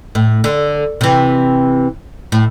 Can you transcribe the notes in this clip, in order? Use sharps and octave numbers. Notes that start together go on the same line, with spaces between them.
A2
D3
C3 E3
A2